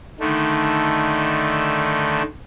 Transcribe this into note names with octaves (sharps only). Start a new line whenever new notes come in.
D3 D#3 A3